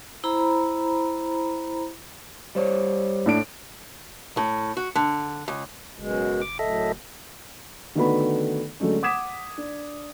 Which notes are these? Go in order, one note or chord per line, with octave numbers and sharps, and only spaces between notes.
E4 C5 A#5 B5
G3 C5 C#5
A2 D4 D7
A2
F#4
D3
C#2
F#1 F#2 B2 G#3
D6
F#2 A2 A4 D#5 E5
D3 D#3 A3 B3 F#4 B5
D3 F#3 G#3 A3 C#4
F#5 D6 D#6 G#6 B6 E7
D4